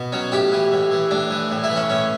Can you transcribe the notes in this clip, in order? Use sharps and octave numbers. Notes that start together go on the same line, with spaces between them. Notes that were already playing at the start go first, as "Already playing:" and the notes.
Already playing: B2
F#3 C#4
A2 G4
E3
A2
E3
A2 D4
E3
A2
E4
E3
C#4
A2 C#4